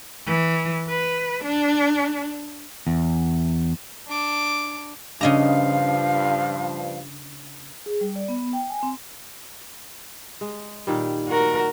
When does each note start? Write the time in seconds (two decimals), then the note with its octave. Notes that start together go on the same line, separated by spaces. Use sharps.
0.26 E3
0.89 B4
1.44 D4
2.87 E2
4.07 D4 D6
5.21 G2 C#3 F3 D4 D#5 F5 A#5
7.86 G#4
8.01 G3
8.16 D5
8.28 B3
8.53 G5
8.70 G#5
8.83 C4
10.41 G#3
10.87 A#2 D#3 G3
11.28 F#4 A#4